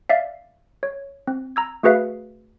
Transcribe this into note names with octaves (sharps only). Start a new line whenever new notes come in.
D5 E5 F5
C#5
C4
A#5 E6 G#6
A3 F#4 G#4 B4 E5 F5